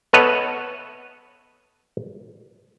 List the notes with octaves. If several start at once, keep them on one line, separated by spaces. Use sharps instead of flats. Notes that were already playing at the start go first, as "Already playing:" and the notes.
B3 A4 B4 C#5 D#5 E5